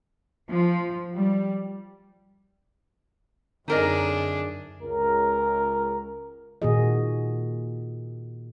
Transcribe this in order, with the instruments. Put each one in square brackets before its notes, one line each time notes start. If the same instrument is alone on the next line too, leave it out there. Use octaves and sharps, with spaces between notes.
[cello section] F3
G3
[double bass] F#2 [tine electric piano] D3 C4 [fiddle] D4 G#4 [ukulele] D#4 A#4 D#5
[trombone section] C#2 A#4
[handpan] A#2 D#3 A#3 F#4 G#4 D#5